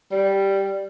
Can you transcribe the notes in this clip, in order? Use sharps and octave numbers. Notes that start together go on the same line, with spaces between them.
G3